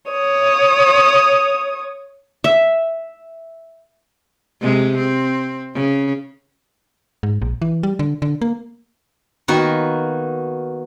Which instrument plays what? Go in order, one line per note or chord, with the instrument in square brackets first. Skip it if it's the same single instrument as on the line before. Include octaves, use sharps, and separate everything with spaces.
[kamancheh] C#5 D#6
[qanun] E5
[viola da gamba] C3 G#3
C4
C#3
[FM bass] G#2
A#1
E3
G3
D3
D3
A#3
[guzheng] D#3 A#3 B3 D#4 F#4 A#4